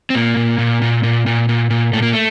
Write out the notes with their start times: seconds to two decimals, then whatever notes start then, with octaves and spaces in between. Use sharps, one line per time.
0.10 C4
0.15 A#2 A#3
0.37 A#2
0.58 A#2
0.82 A#2
1.03 A#2
1.26 A#2
1.49 A#2
1.70 A#2
1.93 A#2 A3
2.03 A#3
2.12 A3